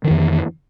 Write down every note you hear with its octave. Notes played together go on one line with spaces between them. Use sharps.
F2 D#3 E3